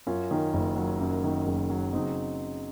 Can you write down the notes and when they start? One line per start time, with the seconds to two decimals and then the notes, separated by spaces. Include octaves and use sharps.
0.07 F#2 C#4 F4
0.31 D#3
0.53 F#1
0.76 F#3
1.01 F#2
1.24 D#3
1.47 F#1
1.70 F#3
1.93 C#3 C4 D#4